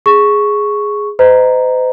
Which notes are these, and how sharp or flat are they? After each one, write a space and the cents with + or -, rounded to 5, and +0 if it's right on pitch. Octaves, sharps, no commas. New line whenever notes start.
G#4 +0 C#6 +0
C5 -45 D#5 +0 A#5 +0